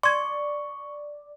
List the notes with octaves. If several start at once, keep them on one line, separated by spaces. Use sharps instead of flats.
D5 C6 C#6 G#6